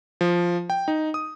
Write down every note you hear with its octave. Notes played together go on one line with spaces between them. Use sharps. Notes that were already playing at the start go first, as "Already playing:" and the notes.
F3
G5
D#4
D#6